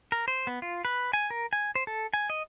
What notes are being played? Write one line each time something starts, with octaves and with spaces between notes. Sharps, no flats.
A#4
C5
B3
F4
B4
G#5
A#4
G#5
C5
A4
G#5
D#5